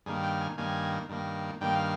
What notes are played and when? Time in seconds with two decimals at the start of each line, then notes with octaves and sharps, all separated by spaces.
0.06 G2 D#3 A#3 G#4
0.23 G5
0.41 G#5
0.58 G2 D#3 A#3 G#5
1.09 G2 D#3 A#3
1.61 G2 D#3 A#3 G5
1.75 F5